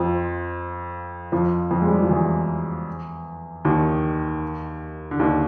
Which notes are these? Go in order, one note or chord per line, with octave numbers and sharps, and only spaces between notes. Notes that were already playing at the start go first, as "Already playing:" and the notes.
Already playing: F2 F3
F2 F3
F2 F3
G#3
G3
F#3
F3
E2 E3
D#2 D#3
D3
D#2 D#3